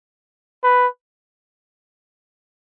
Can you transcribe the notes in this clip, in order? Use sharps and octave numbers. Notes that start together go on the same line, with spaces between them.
B4